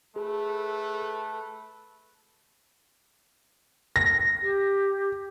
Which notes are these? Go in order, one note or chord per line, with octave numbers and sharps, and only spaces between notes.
A3 G#4 A4 B4
A#6
G4